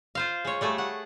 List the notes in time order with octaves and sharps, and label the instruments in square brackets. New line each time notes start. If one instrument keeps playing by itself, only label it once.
[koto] F4 C5 F5
G#3 C#5
G3 A3 G#4 A4
F#5